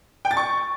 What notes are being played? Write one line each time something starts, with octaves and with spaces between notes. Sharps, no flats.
G5
A6
C#6